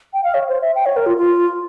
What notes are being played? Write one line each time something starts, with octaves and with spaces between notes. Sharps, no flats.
G5
F5
C#5
C5
E5
G5
C#5
A#4
F4
F4